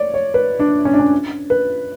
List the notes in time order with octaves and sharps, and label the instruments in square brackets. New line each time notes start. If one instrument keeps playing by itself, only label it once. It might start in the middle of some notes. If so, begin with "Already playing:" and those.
Already playing: [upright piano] C#5 D5
C#5
B4
D4
C#4
D4
C#4
B4